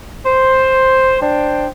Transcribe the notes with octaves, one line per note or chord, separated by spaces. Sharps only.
C5
D4 C5 G5